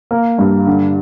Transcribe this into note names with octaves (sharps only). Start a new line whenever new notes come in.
A#3
G2
D3